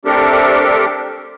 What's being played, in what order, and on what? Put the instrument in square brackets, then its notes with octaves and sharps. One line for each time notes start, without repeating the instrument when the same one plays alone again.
[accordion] A3 C4 D4 G4 A4 A#4